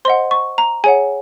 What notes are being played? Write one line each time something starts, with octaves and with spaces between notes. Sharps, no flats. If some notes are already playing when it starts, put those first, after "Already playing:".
C5 D#5 F#5 C6
C#6
A#5
G#4 C#5 F#5 G#5